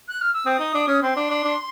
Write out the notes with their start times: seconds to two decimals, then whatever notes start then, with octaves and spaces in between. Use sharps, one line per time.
0.08 F#6
0.21 F6
0.34 E6
0.46 C4 D#6
0.59 D#4
0.75 D4
0.87 C#4
1.02 C4 C6
1.17 D4
1.30 D4
1.44 D4